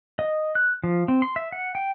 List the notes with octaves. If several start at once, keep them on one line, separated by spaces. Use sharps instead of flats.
D#5
F#6
F3
C4
C6
E5
F#5
G5